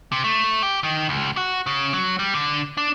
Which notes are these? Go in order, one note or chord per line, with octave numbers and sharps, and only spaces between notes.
C3
A3
G4
D#3
C#2
F#4
C#3
F#3
G3
D3
D4